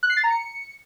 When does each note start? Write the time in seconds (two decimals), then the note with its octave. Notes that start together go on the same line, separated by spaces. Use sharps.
0.03 F#6
0.10 C7
0.17 A6
0.23 A#5
0.30 C#7